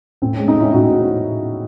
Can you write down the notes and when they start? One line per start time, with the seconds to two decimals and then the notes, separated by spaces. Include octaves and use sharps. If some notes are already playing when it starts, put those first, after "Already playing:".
0.22 A2 C4
0.34 G#3 C#4
0.48 C4 D#4
0.56 G#3 C#4 E4
0.73 A2 D#4 F#4